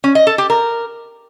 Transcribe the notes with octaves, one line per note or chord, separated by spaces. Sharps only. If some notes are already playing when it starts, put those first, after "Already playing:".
C#4
D#5
A4
G4
A#4